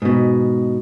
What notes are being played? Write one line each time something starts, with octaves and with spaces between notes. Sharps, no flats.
G#2 B2